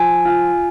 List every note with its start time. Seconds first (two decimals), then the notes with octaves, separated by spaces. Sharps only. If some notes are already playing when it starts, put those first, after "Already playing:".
Already playing: F3 G#5
0.26 F4